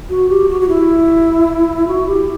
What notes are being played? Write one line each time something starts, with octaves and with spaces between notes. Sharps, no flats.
F#4
G4
F#4
F#4
E4
F#4
G4